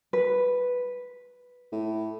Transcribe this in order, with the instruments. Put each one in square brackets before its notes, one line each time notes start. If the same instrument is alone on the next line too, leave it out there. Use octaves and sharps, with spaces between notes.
[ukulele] B4
[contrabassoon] A2